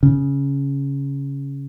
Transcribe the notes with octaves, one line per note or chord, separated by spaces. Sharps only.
C#3